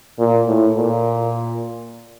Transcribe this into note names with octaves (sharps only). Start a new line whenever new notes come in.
A#2
A2
A#2